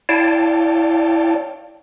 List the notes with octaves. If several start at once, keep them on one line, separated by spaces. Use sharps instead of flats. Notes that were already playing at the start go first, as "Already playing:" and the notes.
E4 C#5 D5 F5 G5 A5